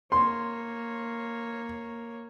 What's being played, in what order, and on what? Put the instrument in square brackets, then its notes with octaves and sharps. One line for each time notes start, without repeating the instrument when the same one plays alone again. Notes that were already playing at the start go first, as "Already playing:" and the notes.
[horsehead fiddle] A#3 C#5 [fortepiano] C6